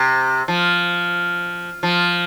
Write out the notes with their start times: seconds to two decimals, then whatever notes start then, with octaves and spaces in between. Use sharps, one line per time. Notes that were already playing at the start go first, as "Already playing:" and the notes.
Already playing: C3
0.48 F3
1.83 F3